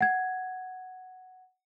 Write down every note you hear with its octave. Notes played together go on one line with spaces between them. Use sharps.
F#5 G#6